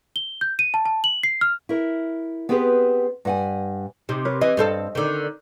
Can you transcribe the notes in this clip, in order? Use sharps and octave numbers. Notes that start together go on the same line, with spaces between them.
G7
G6
D#7
A5
A5
F#7
C7
F6
E4 A#4
B3 C4 G4 G#4 B4 C5
G2 F#5 G#5
C3 D#4
A#4 B4 C#5
E3 D#5
G2 C4 A4
D3 D#3